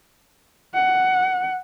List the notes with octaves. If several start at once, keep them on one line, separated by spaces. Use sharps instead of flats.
F#5